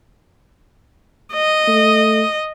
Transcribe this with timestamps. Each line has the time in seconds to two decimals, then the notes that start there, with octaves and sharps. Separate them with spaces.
1.33 D#5
1.68 A3